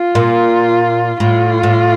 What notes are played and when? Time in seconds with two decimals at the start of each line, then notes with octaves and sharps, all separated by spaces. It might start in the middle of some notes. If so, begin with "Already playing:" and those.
Already playing: F4
0.15 A#2
1.20 A2 F4
1.63 A2